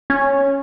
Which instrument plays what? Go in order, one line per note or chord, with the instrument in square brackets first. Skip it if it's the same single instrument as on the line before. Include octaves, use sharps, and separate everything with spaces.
[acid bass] C#4